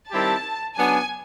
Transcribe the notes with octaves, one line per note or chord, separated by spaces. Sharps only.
D#3 G3 C4 E4 G4 A5
C#3 F#3 B3 D4 G#5